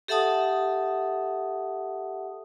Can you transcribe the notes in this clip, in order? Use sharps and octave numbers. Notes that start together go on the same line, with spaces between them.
G4 A4 E5 F#5 A5 D#6